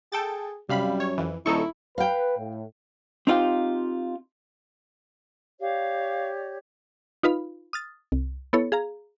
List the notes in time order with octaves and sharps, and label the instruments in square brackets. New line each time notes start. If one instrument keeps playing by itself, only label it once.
[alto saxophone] G#4 [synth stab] A4 G5 A6
[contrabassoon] F#2 [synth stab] C3 F5 B5 [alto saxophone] G3
[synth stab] C#5
F2 E3
[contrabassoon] D#1 [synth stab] D#4 A4 C#6 [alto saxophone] E4
[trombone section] B4 [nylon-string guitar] F5 G5
[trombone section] A2
[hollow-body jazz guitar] C4 D#4 F4 G4
[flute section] G4 C#5 D5 [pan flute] F5
[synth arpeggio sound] D#4 F4 B4 F5 B5
D#6 F6 A6
C2
B3 E4 A4 C#5
G#4 F5 A#5